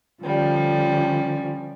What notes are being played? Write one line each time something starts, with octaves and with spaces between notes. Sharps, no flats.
D3 F3 G3 C#4